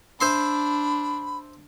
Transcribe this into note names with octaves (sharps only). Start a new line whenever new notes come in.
D4 C5 E5 B5 C6